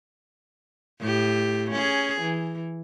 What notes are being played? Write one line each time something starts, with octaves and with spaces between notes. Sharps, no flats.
A2 G4
C#4 G#4
E3